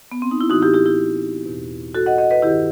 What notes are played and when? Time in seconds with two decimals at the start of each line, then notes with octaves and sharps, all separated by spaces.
0.12 B3
0.22 C4
0.31 D#4
0.41 E4
0.50 A2 E3 D#4 F#4
0.62 E4 G4
0.74 E4 G4
0.86 E4 G4
1.46 E2 B2
1.95 F#4 A4
2.06 D#5 F#5
2.18 D#5 F#5
2.31 B4 D#5
2.42 G2 D#3 E4 G4